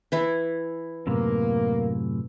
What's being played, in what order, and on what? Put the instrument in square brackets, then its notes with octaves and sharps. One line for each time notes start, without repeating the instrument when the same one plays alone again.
[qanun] E3 E4
[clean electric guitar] F#2 A2 C3 [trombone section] A#3